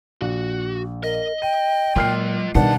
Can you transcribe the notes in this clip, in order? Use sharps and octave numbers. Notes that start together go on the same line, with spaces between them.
A#1 F#4
A#4 D#5
G5 D#7
A#2 F#3 G#3 F4 F6 C7
C2 B2 D#3 G3 B3 D4 F#5 A5